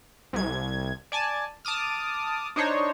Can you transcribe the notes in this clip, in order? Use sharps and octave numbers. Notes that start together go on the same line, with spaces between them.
C2 G#6
D5 G#5 A5
A5 D6 D#6 F6
D4 D#4 C5 C#5